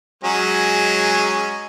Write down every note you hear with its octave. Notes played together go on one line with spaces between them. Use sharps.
F#3 G#3 C#4